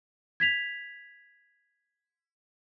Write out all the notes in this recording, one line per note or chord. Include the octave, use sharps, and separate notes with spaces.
G#6 B6 F7